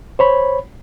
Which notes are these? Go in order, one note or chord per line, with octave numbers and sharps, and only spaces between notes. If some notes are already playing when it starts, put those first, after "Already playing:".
C5 C#5 B5